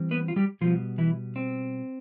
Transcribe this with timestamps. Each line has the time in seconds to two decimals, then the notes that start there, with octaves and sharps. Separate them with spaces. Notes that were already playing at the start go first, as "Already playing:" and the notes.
Already playing: E3 G3 C4
0.11 B3 B4
0.28 F4
0.36 G3 G4
0.61 B2 F3 G3 B3 F4
0.98 E3 E4
1.36 C4